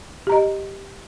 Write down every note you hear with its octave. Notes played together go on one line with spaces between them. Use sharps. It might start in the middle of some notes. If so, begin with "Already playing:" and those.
G4 D#5 A#5